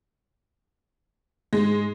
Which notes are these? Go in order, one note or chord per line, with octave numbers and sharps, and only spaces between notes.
G#2 G#3